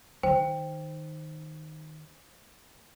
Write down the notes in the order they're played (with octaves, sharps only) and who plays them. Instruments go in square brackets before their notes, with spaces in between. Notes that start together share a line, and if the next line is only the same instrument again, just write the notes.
[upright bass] D#3 [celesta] C5 [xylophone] G5